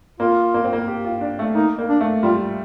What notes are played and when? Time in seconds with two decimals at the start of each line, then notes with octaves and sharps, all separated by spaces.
0.20 A#3 F4
0.54 A#3
0.64 C4
0.73 A#3
0.88 G4
1.05 F4
1.21 D4
1.39 A3
1.55 A#3 D#4
1.78 A#3
1.89 D4
2.01 A3
2.23 G3 F4